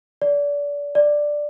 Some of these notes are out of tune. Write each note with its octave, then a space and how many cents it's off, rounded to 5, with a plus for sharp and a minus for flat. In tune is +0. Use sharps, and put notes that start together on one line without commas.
D5 -30
D5 +5